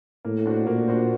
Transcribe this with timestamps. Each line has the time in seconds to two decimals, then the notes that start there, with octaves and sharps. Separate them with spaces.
0.25 A2 A#3
0.46 D4 F#4 C5
0.67 A#2 A#3
0.88 D4 F#4 C5